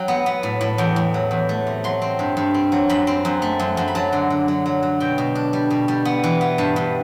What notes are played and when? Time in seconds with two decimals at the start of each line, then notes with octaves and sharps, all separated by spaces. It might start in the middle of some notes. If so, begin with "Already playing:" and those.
Already playing: F#3 G5
0.08 B3
0.26 B3
0.43 A2
0.61 A2
0.78 E2 G5
0.96 E2
1.14 F#3
1.31 E2
1.49 A3
1.67 C3
1.84 F#3 C6
2.02 C4
2.19 G2
2.37 G2
2.54 C4
2.72 F#3
2.89 F#2 B5
3.07 C4
3.25 F#2
3.42 A3
3.60 F#2
3.77 F#2
3.88 B5
3.95 F#3 A5
4.13 D3
4.30 D3
4.48 F#3
4.66 F#3
4.83 F#3
5.00 B2 G5
5.18 B2
5.35 D4
5.53 G3
5.70 B2
5.88 G3
6.05 B3
6.24 E3
6.41 B3
6.58 G2 A5
6.76 G2